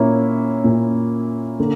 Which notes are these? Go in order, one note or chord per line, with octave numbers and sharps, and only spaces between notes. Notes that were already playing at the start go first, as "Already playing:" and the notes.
Already playing: A#2 A#3 C#4 E4
A#2 A#3 C#4 E4
D3 A#3